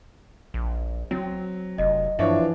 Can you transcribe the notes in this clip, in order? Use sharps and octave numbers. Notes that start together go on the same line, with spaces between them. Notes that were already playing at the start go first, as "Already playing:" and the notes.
A#1
F#3 C4
F1 D#5
G2 E3 F3 D4 C#5 E5